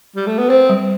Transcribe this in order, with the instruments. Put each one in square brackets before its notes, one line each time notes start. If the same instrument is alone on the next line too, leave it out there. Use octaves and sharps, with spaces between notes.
[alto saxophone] G3
A3
B3
[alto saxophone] C4 [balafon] C5
[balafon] G3